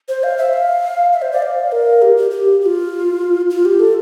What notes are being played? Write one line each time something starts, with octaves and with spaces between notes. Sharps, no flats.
C5
F5
E5
F5
E5
C5
D5
F5
A#4
G4
G4
G4
G4
F4
F4
G4
A4